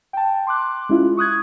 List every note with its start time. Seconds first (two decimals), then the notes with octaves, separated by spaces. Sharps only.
0.13 G5 A5
0.47 C6 D6 F#6
0.89 G#3 C#4 E4 F4
1.17 C#6 D#6 F#6 G#6